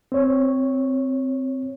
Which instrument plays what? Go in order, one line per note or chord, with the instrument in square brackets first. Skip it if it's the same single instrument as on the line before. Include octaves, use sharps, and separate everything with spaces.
[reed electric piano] C4 C#5